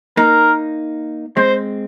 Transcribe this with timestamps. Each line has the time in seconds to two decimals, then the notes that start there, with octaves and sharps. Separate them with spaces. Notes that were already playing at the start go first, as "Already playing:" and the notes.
0.17 A#3 D#4 A#4
1.37 G#3 C4 C5